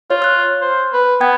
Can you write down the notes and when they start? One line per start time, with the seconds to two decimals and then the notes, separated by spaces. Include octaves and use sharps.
0.10 F4 C#5
0.22 F6 F#6
0.61 C5
0.93 B4
1.21 B3 G5 G#6